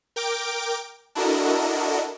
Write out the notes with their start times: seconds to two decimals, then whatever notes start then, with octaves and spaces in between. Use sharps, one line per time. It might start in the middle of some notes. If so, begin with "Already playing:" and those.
0.16 A#4 G5 D6
1.15 D4 E4 F#4 A4 A#4 D#5